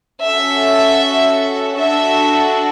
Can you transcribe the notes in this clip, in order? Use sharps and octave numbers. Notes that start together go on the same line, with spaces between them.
C#4 F#4 A4 E5
D4 F#4 A4 E5